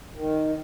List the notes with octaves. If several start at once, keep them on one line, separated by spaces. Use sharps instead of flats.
D#3